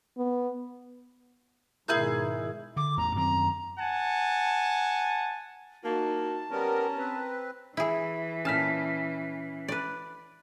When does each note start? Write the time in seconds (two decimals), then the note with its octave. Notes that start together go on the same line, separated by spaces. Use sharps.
0.18 B3
1.88 G#2 B2 D#3 E4 G#4 A#4 F#6 G6
2.76 D3 D6
2.97 A1 E2 A#5
3.16 F#2 D#3 C4 A#5
3.78 F#5 G#5 A5
5.85 A#3 D#4 F#4 A5
6.51 G3 B3 C#4 A#4 A#5
6.98 C4 B4
7.77 E3 E4 G#4
8.45 A#2 C#4 A5 F6 B6
9.68 B4 D5